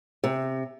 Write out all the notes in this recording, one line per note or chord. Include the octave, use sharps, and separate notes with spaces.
C3